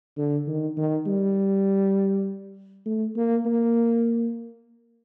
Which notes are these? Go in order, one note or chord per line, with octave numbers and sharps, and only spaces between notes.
D3
D#3
D#3
G3
A3
A#3
A#3